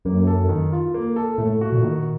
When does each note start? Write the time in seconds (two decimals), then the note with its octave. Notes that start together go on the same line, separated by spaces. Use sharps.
0.05 F#2 A#3
0.27 A4
0.49 D#3
0.72 F4
0.94 A#3
1.16 A4
1.38 A2 A3
1.61 F#4
1.72 A#2
1.83 D#3